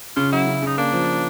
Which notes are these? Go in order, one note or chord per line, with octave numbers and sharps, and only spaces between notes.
C#3 F4
F#3 E4
C#3
C#3 D#4
A#3 D4
F3